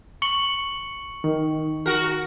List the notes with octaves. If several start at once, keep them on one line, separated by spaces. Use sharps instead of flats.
C#6 C#7 F#7
D#3
F#4 A#4